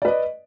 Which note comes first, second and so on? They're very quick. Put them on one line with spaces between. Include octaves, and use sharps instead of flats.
D5 B4 D#5